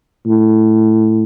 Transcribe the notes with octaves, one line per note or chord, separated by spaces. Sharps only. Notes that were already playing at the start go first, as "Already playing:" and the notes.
A2